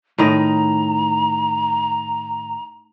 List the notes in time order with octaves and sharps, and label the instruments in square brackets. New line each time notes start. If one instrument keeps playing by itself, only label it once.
[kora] A2 D#3 D#5 [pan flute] A#5